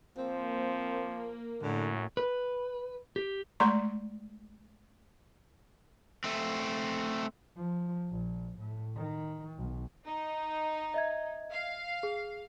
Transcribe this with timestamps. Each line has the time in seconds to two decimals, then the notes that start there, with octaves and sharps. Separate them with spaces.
0.18 F3 A#3 C4
1.62 F#2 A2 D3
2.17 B4
3.16 G4
3.60 G#3 A3 D5 A#5 C6 C#6
6.24 A3 C4
7.56 F3
8.09 A#1
8.58 A2
8.96 D#3
9.58 B1
10.05 D#4
10.94 D#5 E5 G#6
11.49 F5
12.03 G#4